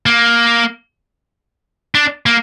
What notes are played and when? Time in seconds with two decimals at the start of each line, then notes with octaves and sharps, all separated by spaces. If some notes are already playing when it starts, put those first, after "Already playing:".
0.06 A#3
1.95 D4
2.26 A#3